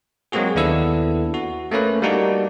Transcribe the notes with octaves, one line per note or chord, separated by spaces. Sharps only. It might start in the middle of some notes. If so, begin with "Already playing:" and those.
F#3 G#3 A#3 C4 F#4 G#4
D#2 B3 D4 E4 A4 E6
F#4
A3 A#3 C#4 B4
G3 A#3 D4 D#4 F#4